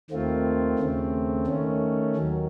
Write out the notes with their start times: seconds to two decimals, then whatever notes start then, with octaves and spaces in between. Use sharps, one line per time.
0.10 D#2 D#3 A3 C4 F4
0.79 D#2 C#3 A3 C4
1.47 D#3 A3 C#4
2.16 D#2 D#3 F#3